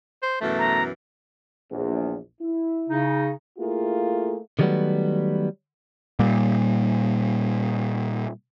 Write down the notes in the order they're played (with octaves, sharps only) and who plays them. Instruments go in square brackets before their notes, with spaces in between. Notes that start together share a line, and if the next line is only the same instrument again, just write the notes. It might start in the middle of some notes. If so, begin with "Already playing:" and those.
[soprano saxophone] C5
[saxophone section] F#2 B2 E3 [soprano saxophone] A3
[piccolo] A#5
[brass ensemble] A#1 E2
E4
[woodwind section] C#3 D#4
[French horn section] A3 A#3 E4 F4 G#4
[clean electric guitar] D3 D#3 F#3 G3 A3 B3
[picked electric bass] A#2 G3